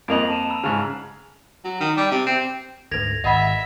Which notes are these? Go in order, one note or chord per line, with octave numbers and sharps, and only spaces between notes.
F2 A#3 D#5 D7 F7 F#7
A5 D#7 E7
A#5 B5 E6
G#2 C#3 G#5 F6 F7
F#3
D#3
G3
C3
C4
D2 G#2 A4 B4 G#6 A#6 F7
G#1 D#5 E5 F#5 B5